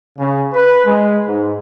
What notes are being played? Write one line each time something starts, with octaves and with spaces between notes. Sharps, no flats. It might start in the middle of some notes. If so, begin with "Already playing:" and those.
C#3
B4
G#3
G#2